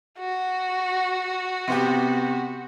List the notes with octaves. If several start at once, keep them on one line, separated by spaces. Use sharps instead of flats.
F#4
C3 B3 G4